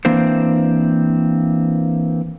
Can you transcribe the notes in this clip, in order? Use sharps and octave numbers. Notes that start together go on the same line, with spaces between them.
E3 A#3 C4 D4 C5